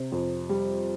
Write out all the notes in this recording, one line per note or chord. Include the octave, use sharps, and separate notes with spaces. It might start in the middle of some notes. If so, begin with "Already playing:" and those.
Already playing: C3
F2
G3